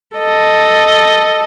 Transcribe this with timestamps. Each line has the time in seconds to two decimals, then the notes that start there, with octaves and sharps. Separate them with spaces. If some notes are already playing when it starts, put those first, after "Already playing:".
0.17 A4 D#5